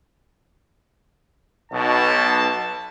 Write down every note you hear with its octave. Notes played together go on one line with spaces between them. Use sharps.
B1 B2 A5